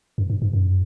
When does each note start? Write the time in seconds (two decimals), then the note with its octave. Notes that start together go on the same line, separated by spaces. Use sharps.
0.18 F#2
0.30 G2
0.42 G2
0.53 F#2